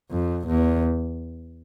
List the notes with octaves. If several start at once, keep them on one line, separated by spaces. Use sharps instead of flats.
F2
E2